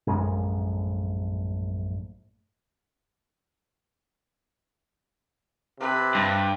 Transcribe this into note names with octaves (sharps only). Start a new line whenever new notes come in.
A#1 F#2 A2 G#3
C3 B4
G2